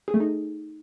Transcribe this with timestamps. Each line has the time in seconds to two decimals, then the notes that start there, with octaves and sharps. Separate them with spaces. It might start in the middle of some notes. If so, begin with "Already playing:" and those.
0.08 G#4
0.14 A3
0.20 D#4